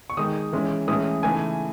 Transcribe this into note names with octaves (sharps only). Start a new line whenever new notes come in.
C#6
D#3 G#3 D#4 D#6
E3 G#3 C#4
A2 E3 G#3 C#4 D#6
C#3 E3 A3 D#4 G#5